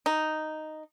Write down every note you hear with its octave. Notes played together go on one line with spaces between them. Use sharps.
D#4